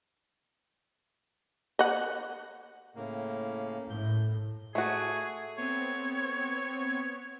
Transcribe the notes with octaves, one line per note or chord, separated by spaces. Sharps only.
D#5 F#5
A2 C#3 A#3
A2 G6
A3 F#4 G#4
B3 C4 C#5